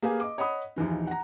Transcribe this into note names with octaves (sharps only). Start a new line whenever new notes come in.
A#3 G4 G#4 B4 F5 G#5
D#5 D6
C#5 D#5 F#5 B5 D#6
A#1 D#2 E3 D#4
F#5 A#5